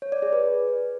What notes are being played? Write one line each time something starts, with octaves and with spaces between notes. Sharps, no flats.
C#5
D5
G#4
B4